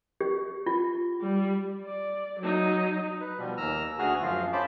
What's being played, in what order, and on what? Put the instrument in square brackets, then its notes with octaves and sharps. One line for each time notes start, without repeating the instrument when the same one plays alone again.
[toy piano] G4
F4
[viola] G3
D5
F#3 D#4
[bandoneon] B4
B2 F3 G3
D#2 A#5 E6 F6
D2 F#4 G#4 F6
F#2 F3 F4 F5
C#4 C5 A5 B5 D6